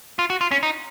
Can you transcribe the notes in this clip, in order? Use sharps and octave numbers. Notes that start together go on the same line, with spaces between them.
F4
F#4
F4
C#4
D#4